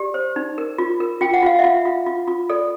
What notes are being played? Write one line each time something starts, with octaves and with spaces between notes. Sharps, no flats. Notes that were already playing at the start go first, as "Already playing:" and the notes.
Already playing: G4 D5
C5
D#4
A#4
F4
A#4
F4 G5
F#5
F4 F5
F4 E5 F#5
F4
F4
F4
A4 D5